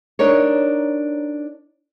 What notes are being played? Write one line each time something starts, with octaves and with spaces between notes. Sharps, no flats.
D4 D#4 A#4 C#5